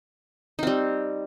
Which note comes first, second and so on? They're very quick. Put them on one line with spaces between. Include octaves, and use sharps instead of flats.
D#4 C4 G3